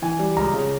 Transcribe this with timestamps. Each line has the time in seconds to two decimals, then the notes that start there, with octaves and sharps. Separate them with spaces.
0.02 E3 G#5
0.19 G3
0.36 C#2 A#5
0.53 C#3